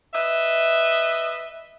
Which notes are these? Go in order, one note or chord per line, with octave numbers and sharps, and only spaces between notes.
B4 D#5 E5